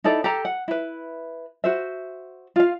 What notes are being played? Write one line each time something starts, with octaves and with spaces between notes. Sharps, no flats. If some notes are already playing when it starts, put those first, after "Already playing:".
D#4 E4 A4 D5
G4 A4 A#5
F#5
E4 B4
F#4 C5 E5
F4 F5